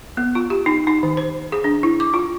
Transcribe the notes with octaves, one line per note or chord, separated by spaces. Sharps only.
B3
F4
G4
D#4
D#4
D#3
C5
G#4
D4
E4
D6
F4